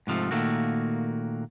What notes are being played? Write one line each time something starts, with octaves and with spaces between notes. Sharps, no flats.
G#2 C3 F3 A3
A#2 D#3 A3 A#3 F#4